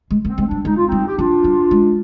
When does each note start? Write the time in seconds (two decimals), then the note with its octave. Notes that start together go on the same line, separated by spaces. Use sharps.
0.11 G#3
0.25 A#3
0.29 C4
0.38 G#3
0.41 C4
0.46 D4
0.51 G3
0.65 G#3 D#4
0.76 F4
0.87 G3 C4 D#4
1.07 G4
1.18 F3 D4 F4
1.44 G3
1.71 G#3